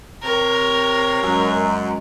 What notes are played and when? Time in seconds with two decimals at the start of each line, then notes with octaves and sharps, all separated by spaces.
0.23 C3 A#4 C#5
1.22 F#2 G#3